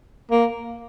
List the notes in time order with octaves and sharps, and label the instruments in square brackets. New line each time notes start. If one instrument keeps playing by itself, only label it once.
[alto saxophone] A#3